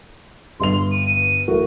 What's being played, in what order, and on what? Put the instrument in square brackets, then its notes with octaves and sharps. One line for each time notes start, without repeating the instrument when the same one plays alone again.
[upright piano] G1 G2 F7 [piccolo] C6
[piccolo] D#7
[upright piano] A1 F#4 A#4